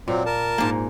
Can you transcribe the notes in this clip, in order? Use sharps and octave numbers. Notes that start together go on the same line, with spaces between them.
A#2 F#3 C4
A#4 A5
G#2 A#3